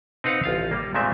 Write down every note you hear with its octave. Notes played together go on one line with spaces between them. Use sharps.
C4 D#4 B4 F5 F#5
A1 F4 F5
G3 A#3
A#2 G#3 A3 C4 E5